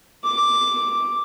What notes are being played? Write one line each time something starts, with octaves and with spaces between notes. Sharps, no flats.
D6